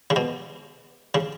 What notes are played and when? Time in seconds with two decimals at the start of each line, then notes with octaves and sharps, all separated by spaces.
0.10 C#3
0.16 B2
1.15 C#3